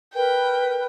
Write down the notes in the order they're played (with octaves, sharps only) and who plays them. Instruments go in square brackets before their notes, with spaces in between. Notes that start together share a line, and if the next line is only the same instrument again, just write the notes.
[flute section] A#4 B4 [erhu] G5